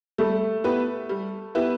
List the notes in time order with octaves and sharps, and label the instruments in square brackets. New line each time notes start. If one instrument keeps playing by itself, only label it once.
[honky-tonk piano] G3 [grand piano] A3
[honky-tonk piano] B3 E4 G4 B4
G3
B3 E4 G4 B4